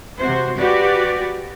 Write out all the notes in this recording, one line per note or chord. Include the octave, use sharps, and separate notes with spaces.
C3 F#4 C5
F#4 G4 B4 D5